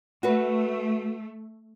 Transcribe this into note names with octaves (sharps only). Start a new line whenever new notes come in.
A3 F#4 B4